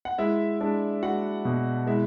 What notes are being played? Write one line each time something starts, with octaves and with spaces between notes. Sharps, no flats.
F#5
G#3 E4 E5
G#3 D4 D5
G#3 F#4 F#5
B2
G#3 E4 E5